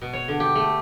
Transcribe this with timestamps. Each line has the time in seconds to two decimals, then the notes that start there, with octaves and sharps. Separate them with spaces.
0.02 B2
0.13 C#5
0.28 D3
0.40 G4
0.55 A3